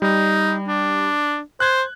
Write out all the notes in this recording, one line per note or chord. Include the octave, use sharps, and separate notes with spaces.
G3 D#4
D4
C5 F#6 G#6